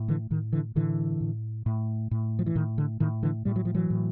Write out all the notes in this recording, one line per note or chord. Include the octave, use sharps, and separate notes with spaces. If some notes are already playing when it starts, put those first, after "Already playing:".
Already playing: A2
D3 E3
A2 D#3
D3 E3
A2 D3 E3
A2
A2
A2
F3
E3
A2 D#3
D3
A2 D#3
D3 E3
A2 G3
F#3
F3
E3 F#3
A2